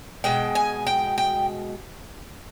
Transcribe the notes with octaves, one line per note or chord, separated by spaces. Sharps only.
B2 G#3 G5
G#5
G5
G5